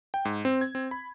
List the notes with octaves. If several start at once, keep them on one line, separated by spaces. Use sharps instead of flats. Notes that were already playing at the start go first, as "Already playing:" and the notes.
G5
G#2
C4
G#6
C4
B5